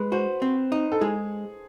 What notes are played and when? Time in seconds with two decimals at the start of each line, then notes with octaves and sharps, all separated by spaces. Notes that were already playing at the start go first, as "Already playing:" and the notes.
Already playing: G#3 B4
0.12 F#4 C5
0.42 C4
0.72 D#4
0.92 A4
1.01 G#3 G#4